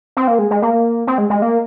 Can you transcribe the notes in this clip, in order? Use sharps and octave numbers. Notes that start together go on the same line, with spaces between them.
C4
A#3
G#3
G#3
A#3
C4
G#3
G#3
A#3